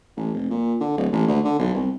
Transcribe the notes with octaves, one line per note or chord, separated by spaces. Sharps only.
A1
F1
A#2
D3
D1
A1
D2
D3
B1
C2